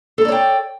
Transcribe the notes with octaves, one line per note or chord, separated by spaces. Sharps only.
A4 C#5 D5 G5 A#5